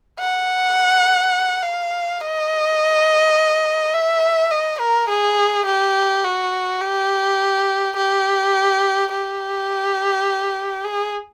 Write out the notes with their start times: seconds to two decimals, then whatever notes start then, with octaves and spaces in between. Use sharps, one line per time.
0.19 F#5
1.63 F5
2.21 D#5
3.94 E5
4.51 D#5
4.80 A#4
5.09 G#4
5.66 G4
6.24 F#4
6.81 G4
7.97 G4
9.12 G4
10.85 G#4